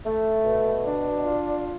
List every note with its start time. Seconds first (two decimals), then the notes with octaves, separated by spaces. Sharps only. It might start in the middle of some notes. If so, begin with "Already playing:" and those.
0.05 A3
0.45 B2
0.85 D4
1.25 F4